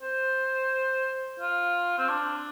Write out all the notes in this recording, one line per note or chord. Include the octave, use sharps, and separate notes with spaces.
C5
F4
C4
D4